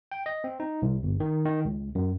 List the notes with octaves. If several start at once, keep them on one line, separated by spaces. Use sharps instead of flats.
G5
D#5
C4
D#4
C2
G1
D#3
D#3
C#2
F#2